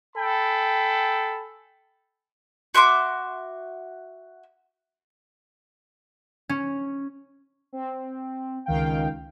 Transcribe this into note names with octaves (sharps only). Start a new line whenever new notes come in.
A4 G5 G#5 B5
F#4 E5 C6 D6
C#4
C4
C#2 D#3 F5 G5